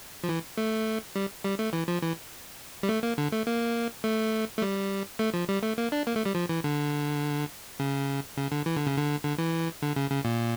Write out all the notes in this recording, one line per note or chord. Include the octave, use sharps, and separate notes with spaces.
F3
E3
A3
G3
G3
A3
E3
F3
E3
G3
A3
A#3
D3
A3
A#3
A3
A3
G3
A3
F3
G3
A3
A#3
D4
A#3
A3
G3
F3
E3
D3
C#3
C#3
D3
E3
D3
C#3
D3
D3
E3
D3
C#3
C#3
A#2